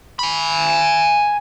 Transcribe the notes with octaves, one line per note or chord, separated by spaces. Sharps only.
G#5 B5